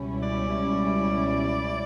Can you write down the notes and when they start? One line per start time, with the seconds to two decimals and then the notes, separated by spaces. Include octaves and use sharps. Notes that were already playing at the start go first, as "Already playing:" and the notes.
Already playing: C#2 B2 G3 C#4 E4
0.23 D5